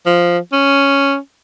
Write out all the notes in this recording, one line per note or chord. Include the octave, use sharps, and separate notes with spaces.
F3
C#4